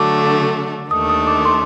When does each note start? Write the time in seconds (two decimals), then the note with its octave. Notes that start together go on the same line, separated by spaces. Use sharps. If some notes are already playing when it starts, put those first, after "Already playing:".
Already playing: D3 F#3 A3 D4 D6
0.91 D#2 D#3 A3 D4 D#6
1.09 D#6
1.27 D6
1.45 C6